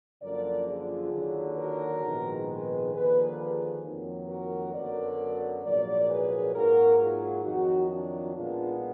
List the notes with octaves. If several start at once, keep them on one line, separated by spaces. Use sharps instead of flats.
F#2 D3 F3 A#3 A#4 D5
F4 G#4
D#2 D3 F#3
F#4 A#4
A#1 G#2 D#3 G#3 B3
G#4 B4
D#2 D3 F3 A#3 G#4 B4
G#4 B4
F2 D#3 F#3 A#3
F#4 A#4
F#2 D3 F#3 B3 A#4 D5
A#1 G#2 F#3 A#3 A#4 D5
G#4 B4
G#2 F#3 A#3 F#4 A#4
F4 G#4
F2 D#3 F#3 D#4 F#4
D4 F4
B1 A#2 G#3 B3 D4 F4